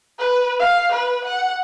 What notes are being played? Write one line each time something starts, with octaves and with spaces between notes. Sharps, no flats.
B4
F5
B4
F#5